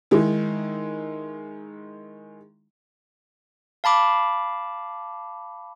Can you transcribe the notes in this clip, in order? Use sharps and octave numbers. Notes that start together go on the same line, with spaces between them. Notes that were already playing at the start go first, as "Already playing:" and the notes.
D#3 G#3 D#4 E4
F5 A5 B5 D6